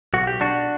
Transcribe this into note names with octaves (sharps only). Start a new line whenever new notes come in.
B1 F#4
G4
B1 D4 F#4